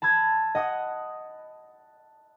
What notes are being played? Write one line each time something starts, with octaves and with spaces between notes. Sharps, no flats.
A5 B5 E6 G#6
D#5 F#5 D#6